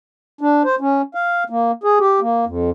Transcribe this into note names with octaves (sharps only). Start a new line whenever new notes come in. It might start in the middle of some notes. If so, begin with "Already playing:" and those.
D4
C5
C#4
F5
A#3
G#4
G4
A#3
F2